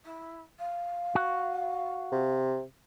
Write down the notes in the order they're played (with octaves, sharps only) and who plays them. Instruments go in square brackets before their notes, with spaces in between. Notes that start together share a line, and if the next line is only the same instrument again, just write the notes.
[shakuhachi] E4
F5
[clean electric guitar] F#4
[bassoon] C3